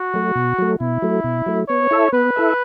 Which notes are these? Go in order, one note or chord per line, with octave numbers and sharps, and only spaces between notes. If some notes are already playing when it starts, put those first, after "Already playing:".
Already playing: F#4
F#3 A3
B2
F#3 A3
B2 E4
F#3 A3
B2
F#3 A3
B3 C#5
E4 A4 E5
B3 B4
E4 A4 E5